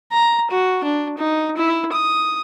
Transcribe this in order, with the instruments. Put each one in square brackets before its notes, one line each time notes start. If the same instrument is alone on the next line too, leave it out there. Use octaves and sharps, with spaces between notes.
[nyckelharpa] A#5
F#4
D4
D#4
E4
D#6